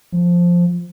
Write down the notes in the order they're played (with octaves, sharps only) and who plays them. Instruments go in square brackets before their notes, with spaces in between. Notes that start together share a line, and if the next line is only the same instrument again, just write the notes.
[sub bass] F3